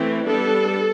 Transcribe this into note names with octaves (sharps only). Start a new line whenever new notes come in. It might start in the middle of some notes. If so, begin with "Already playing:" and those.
Already playing: E3 A3 C4
G3 B3 D4 A4